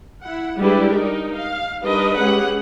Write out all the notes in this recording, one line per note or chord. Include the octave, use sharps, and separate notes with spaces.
E4 F#5
G3 G#3 D4 E4 G4 B4
D#4 A#4
F5
G3 D4 D#4 A#4 B4 D#5
G#3 C#4 G4 G#4 F#5